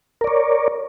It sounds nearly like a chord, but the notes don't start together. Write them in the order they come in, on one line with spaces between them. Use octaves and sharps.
A#4 D5 C#5